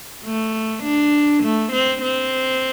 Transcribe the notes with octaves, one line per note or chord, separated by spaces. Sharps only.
A3
D4
A3
C4
C4